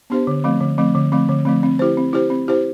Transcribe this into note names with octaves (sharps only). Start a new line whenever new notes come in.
B3 D4 G4 C5
D3
F3 A3 C4
D3
F3 A3 C4
D3
F3 A3 C4
D3
F3 A3 C4
C4
E4 G4 C5
C4
E4 G4 C5
C4
E4 G4 C5